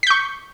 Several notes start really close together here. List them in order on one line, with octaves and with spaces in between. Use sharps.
B6 G6 C#6